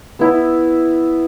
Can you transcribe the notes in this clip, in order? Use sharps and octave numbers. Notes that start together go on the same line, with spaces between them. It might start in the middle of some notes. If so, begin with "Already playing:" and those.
B3 E4